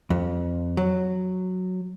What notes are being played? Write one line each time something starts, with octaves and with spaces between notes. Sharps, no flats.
F2
F#3